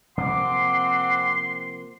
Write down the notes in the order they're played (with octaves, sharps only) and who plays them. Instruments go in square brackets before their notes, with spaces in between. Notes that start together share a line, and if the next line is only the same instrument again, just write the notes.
[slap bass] C3 F3 A#3 [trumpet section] C4 F#5 D6 [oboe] C6